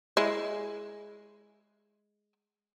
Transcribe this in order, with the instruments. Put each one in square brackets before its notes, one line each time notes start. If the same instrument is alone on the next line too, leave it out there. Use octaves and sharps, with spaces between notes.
[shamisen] G#3 E4